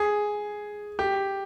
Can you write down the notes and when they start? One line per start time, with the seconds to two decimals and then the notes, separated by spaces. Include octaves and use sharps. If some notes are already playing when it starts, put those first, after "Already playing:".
Already playing: G#4
0.99 G4